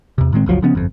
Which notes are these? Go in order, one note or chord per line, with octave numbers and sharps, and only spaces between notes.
E2 C3
A2 D#3 G#3 C4
F#1 C#2 F3 F#3
C#3 F3 B3 C#4
G1 F2